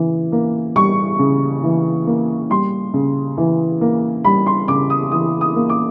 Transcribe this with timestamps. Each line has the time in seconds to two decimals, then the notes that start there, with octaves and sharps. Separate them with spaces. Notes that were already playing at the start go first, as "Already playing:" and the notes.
Already playing: C#3 E3
0.32 A#3
0.76 G3 C#6
1.19 C#3
1.63 E3
2.07 A#3
2.50 G3 C6
2.94 C#3
3.38 E3
3.81 A#3
4.25 G3 B5
4.46 C6
4.68 C#3 D6
4.90 D#6
5.12 E3 D#6
5.41 D#6
5.56 A#3
5.70 D6